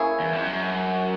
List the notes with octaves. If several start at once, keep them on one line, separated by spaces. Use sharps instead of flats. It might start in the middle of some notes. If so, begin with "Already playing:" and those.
Already playing: A#3 C#4 E4 G#4
E2
F2
F#2